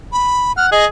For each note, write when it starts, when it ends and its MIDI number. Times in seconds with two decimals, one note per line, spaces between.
0.12 0.52 83
0.57 0.71 78
0.57 0.67 89
0.72 0.86 68
0.72 0.85 75